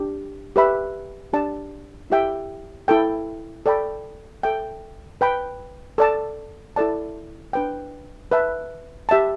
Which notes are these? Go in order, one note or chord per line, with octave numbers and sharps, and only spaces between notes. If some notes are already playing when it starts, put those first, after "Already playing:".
Already playing: D4 G4
G4 B4 E5 B5
D4 G4 D5 A5
E4 G4 E5 G5
E4 A4 G5
A4 D5 G5 B5
A4 E5 G5
B4 G5 B5
A4 D5 A5
E4 A4 D5 A5
D4 B4 G5
B4 E5 A5
G4 E5 A5